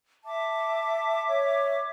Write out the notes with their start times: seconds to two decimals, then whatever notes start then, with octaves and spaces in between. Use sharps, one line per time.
0.24 E5 A5 D6
1.28 C#5